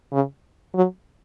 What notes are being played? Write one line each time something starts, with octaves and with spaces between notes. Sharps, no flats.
C#3
F#3